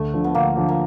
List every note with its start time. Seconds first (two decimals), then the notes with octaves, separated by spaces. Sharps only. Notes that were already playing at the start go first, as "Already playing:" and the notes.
Already playing: D2 A3
0.14 D3 F3
0.24 B3
0.35 D2 A#3
0.57 D3 F3
0.69 A#3